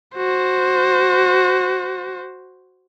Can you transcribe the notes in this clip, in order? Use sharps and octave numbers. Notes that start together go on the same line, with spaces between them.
F#4 C5